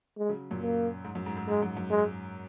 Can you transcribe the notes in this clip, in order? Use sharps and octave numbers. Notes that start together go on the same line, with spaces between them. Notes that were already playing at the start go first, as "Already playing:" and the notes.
G#3
C#3 F#3
F#2 A#2
A#3
G#2
F#2
G#2
G#2
G#2 G#3
F#2
F#2
G#3